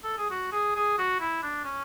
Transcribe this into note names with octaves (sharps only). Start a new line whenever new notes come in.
A4
G#4
F#4
G#4
G#4
F#4
E4
D4
C#4